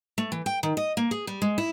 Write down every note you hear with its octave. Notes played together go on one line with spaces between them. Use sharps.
A3
E3
G5
D#3
D#5
A#3
G#4
G3
G#3
E4